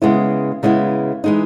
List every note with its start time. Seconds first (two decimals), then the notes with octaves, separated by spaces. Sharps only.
0.02 C#3 G#3 B3 E4
0.63 C#3 G#3 B3 E4
1.24 E3 G#3 D#4